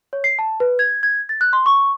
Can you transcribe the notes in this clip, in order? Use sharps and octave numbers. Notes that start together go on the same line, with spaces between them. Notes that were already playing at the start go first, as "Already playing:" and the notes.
C#5
C7
A5
B4
G#6
G#6
A6
F#6
C6
C#6